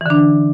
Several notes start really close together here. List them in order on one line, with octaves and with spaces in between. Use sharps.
E3 D3 D4